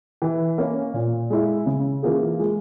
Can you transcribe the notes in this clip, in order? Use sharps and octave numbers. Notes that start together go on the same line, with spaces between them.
E3
A#3 C#4
A#2
G#3 E4
C#3
E3 A#3 F4 G#4
G#3